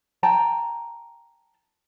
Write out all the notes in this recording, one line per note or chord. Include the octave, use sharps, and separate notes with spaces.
G5 A5 A#5